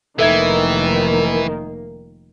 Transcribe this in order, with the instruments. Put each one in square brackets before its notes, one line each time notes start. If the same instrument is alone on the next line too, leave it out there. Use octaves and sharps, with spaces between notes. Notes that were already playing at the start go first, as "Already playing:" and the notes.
[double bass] F1 A#3 [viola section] D#3 [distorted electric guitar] E3 [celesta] A4 E5 G#6